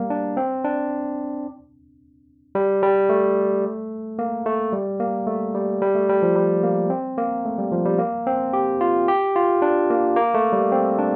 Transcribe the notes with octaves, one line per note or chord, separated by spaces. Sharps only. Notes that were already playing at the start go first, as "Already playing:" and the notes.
Already playing: G3 A#3
D4
C4
D4
G3
G3
A3
A#3
A3
G3
A#3
A3
G3
G3
A3
G3
F3
G3
A#3
C4
A#3
A3
G3
F3
G3
A#3
C4
G4
F4
G4
F4
D4
A#3
A#3
A3
G3
C4
D4